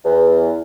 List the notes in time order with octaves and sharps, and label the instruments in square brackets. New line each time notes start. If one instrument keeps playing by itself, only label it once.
[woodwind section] E2